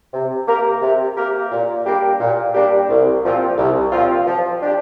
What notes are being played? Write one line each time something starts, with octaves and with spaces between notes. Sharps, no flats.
C3
A#3 G4 A#4
C3
A#3 G4 A#4
A#2
G3 A#3 D4 G4
A#2
G3 A#3 D4 G4
C2
A#2 F3 C4 F4
C2
A#2 F3 C4 F4
F3
D4 G4